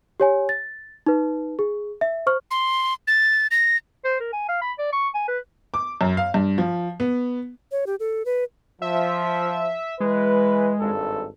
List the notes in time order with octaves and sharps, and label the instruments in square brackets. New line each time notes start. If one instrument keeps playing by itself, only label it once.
[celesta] G4 C#5 G#5
A6
D#4 B4
G#4
E5
C5 C#6 F6
[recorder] C6
A6
A#6
[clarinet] C5
A#4
G#5
F5
B5
D5
C#6
G#5
B4
[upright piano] D6
F#2
F5
G2
F3
B3
[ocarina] C#5
G4
A4
B4
[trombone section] F3 [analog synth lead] E5
[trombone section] E3 B4 [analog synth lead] G#3
[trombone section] G#1 G2 A4